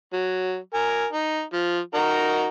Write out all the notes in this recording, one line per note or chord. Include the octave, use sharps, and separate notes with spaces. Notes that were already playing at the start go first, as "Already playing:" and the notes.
F#3
A#4 G#5
D#4
F3
D#4 F#4 A#4